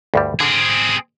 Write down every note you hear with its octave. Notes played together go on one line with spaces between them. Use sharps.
D2 G2 G3
D3 C4 G#4